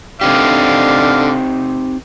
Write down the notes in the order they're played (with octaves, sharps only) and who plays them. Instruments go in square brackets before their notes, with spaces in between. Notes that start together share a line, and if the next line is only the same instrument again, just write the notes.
[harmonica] D3 D5 F5 [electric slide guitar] C4 D#4 G4